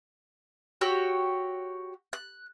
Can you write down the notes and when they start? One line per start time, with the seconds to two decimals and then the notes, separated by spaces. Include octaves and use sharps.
0.81 F#4 G4 C#5 E6
2.13 F#6